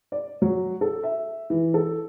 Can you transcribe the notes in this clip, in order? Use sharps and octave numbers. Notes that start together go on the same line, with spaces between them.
D5
F#3
A4
E5
E3
A4